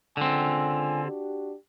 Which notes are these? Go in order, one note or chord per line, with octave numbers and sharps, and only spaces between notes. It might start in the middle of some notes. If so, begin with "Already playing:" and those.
C#2 D3 C4 F4 G#5
D4 F#4 G4